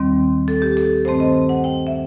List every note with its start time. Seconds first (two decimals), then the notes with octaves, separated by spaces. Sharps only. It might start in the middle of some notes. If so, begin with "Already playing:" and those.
Already playing: D#2 D#3 G3 C4
0.48 A4
0.62 G4
0.77 A4
1.05 G2 D#3 A3 C4 C5
1.20 D#5
1.49 F#5
1.64 G5
1.87 E5